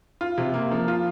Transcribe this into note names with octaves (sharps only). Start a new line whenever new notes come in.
F4
C3
A#3
F3
F4